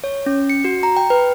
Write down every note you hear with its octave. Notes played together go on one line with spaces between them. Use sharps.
C#5
C#4
C#7
F#4
A#5
G5
B4